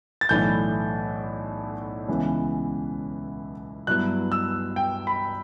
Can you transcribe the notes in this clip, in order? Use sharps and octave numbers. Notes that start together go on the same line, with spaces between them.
A6
B1 A2 E3 A3 D4 G6
C#2 C#3 E3 B3
G2 F#3 B3 E4 F#6
E6
G5
B5